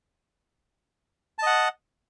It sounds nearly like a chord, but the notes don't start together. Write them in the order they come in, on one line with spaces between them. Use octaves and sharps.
A5 D#5 F#5